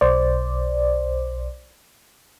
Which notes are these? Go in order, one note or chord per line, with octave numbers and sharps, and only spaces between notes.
B1 C5 D5